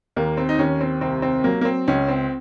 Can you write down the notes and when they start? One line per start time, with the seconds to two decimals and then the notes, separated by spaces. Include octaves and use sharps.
0.16 D#2 A#3
0.37 C4
0.49 D#4
0.58 D#2 C#4
0.81 C4
1.01 C2 C4
1.22 C4
1.44 F#3 A#3
1.61 A#3
1.65 C4
1.88 C#2 C#4
2.08 C4